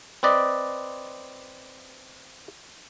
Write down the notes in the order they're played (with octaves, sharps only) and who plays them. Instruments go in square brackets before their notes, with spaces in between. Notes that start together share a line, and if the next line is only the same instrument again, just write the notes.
[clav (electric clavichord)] C4 B4 D5 D#5